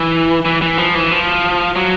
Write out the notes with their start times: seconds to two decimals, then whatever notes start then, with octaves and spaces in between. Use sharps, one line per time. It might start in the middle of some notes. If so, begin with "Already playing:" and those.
Already playing: E3
0.45 E3
0.62 E3
0.78 F3
0.95 E3
1.11 F3
1.76 F#3